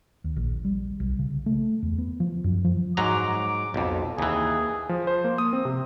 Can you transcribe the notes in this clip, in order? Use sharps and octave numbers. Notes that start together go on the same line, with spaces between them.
D#2
A#1
G3
B1
C#3
A3
E2
B3
F3
F#2
F3
G#2 F#3 A#5 D6
B1 F2
D#2 E3 G#4
F3
C5
A#3
D#6
C4
C3